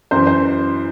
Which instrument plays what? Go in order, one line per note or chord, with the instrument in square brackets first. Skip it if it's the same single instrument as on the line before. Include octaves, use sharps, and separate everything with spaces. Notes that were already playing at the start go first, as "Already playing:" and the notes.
[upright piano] F#2 E3 C5
C5